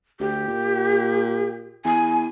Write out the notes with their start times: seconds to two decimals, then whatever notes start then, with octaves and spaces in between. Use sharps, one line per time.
0.20 D2 G4
0.48 A#2
1.85 E2 G#5